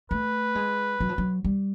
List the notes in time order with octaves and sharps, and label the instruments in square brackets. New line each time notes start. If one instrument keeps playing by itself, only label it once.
[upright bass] A3 [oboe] B4
[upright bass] G#3
F#3
F3
F#3
G3